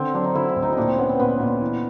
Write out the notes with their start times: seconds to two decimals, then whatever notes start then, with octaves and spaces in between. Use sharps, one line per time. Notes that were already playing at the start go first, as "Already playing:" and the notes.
Already playing: D3 C4
0.14 F#3 D4
0.24 D#4
0.35 D3 E4
0.49 E4
0.56 D2
0.63 D#4
0.73 A#2 D4 D#4
0.88 C4
0.98 B3 C#4
1.09 C4
1.19 A#2 B3
1.40 A#2
1.61 E3